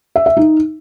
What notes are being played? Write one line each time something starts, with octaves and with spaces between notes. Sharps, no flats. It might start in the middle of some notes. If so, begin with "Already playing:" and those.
E5
E5
D#4